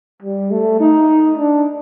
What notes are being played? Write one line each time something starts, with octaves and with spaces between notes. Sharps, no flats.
G3
A3
D#4
D4